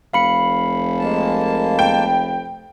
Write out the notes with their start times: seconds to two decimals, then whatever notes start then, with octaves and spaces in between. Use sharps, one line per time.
0.13 F1 F5 B5 C#7
0.99 G#3 A#3 A5
1.79 G5